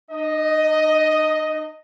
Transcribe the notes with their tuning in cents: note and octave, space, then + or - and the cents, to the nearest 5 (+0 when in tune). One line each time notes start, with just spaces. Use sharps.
D#4 -40 D#5 +5